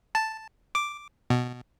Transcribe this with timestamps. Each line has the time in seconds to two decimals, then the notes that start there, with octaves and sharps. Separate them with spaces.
0.15 A5
0.75 D6
1.30 B2